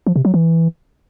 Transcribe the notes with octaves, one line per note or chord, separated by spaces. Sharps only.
F3
C3
F#3
E3